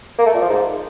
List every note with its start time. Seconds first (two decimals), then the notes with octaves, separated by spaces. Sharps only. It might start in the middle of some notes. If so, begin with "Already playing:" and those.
0.18 A#3
0.26 A3
0.34 A#2
0.41 F3
0.49 G#2